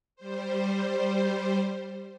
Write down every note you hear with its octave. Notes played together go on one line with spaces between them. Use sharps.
G3 C5